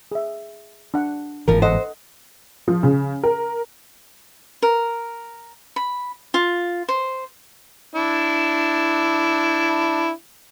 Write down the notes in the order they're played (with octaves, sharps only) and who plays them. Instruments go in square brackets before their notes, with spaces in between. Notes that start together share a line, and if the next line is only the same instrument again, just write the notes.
[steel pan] G#4 E5
D4 F#5
[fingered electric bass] G1 G#2 E3 [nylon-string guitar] F3 F4 A#4
[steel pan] A4 D#5 F#5 [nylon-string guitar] C5
[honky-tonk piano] F3
C#3
A#4
[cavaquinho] A#4
B5
F4
C5
[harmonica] D4 E4